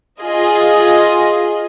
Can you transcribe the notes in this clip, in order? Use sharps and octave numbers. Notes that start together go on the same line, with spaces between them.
F4 G#4 D#5